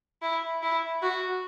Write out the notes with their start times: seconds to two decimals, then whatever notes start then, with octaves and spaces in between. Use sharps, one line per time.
0.22 E4
0.63 E4
1.02 F#4